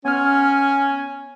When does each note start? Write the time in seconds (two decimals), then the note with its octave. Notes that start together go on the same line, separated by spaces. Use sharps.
0.05 B3 C#4 G#5 F6